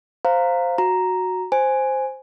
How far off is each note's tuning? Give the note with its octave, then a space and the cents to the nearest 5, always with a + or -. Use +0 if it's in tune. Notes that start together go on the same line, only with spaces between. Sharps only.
C5 +0 F5 +0 A#5 -10
F#4 -5 A#5 +0
C5 +0 G#5 +0